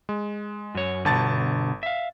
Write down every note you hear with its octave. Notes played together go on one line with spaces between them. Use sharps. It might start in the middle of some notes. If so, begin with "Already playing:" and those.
G#3
F#2 C#5
G1 B2 D3 A5 A6
E5 F5